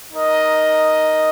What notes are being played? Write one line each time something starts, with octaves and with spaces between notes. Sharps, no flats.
D#4 A#4 D#5